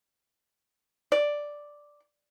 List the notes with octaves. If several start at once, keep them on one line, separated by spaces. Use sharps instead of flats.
D5